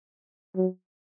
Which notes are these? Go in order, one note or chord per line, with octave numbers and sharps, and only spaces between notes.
F#3